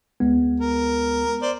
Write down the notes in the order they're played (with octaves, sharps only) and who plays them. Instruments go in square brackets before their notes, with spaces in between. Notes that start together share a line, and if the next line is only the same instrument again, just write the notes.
[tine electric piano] D2 G#3 B3
[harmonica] A#4
C5 D5